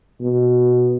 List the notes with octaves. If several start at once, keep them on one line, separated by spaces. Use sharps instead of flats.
B2